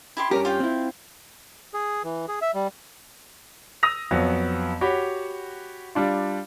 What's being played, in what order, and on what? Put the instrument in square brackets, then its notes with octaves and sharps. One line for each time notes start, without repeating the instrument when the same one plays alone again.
[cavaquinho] E4 G4 C6
[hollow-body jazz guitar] G2 C#4 G4 [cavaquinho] A#4
[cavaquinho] F4 F5 G5
[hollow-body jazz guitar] C4 E4
[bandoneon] G#4
E3
G#4
E5
G3
[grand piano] D#6 E6 A#6 F7
F2 F#3 B3
F#4 G4 C#5 B5
G3 D4 F4